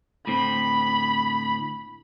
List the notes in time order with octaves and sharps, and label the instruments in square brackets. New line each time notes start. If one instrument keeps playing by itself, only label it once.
[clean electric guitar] A2 D3 C4 [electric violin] B5